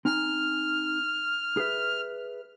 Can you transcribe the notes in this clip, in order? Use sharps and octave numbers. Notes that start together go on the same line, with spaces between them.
C4 D#4 G#5 F6
G#4 B4 E5